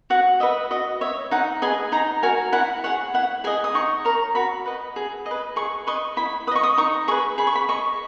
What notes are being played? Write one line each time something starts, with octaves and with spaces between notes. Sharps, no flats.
F#4 F#5
B4 D#5 E5
F#4 D#5
C#5 E5
D#4 F#5
G#4 B4 D#5 G#5
D#4 A#5
F#4 A#4 G#5
E4 F#5
G#4 C#5 F#5
E4 F#5
G#4 D#5 G#5
D#6
D#4 C#6
A#4 C#5 A#5
F#4 B5
B4 D#5
G#4
D#5
B4
G#4 C#6
B4 D#5 C#6
E4 B5
B4 D#5 C#6 D#6
D#6
D#4 C#6
G#4 B4 C#6
G#4 B5
C#6
B5
D#5 C#6